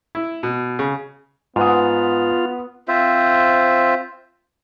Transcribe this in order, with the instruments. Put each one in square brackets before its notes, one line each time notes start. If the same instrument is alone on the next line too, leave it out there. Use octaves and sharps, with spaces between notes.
[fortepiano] E4
B2
C#3
[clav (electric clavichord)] G#2 [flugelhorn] B3 [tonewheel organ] F4 [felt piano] B4 F#5 D#6
[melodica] C4 F4 C5 E5